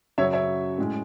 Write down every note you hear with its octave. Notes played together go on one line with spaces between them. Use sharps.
F#2 C#3 F#3 C#5 E5
C#5 E5
A2 G#3 C#4